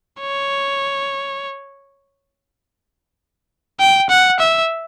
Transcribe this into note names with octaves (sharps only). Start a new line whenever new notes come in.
C#5
G5
F#5
E5